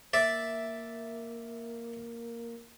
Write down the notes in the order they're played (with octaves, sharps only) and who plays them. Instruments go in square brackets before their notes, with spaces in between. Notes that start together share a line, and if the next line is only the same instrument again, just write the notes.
[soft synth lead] A#3 [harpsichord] D5 E5